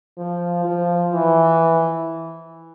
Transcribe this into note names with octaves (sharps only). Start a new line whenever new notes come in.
F3
F3
E3